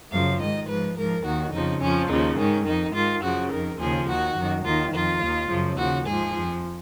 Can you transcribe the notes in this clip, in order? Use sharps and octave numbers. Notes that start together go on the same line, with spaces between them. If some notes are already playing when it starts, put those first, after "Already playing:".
F#2 C#3 F3 F5
G#2 D#3 D#5
G#2 F3 B4
G#2 F3 A#4
D#2 D#3 F#4
F2 C#3 F3 D#4
F2 F3 C#4
D#2 C#3 F3 D#4
G#2 D#3 C#4
F2 D#3 D#4
G#2 D#3 F4
F#2 C#3 F3 F#4
F2 D#3 A#4
D#2 C#3 F3 G#4
D#2 D#3 F#4
F#2 D#3
D#2 D#3 F4
F2 D#3 F4
D#2 D#3
F#2 C#3 F3
D#2 C#3 F3 F#4
G#2 F3 G#4
F2 F3